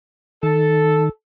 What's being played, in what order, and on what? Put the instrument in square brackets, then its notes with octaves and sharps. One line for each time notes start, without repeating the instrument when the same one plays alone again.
[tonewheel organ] D#3 [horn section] A4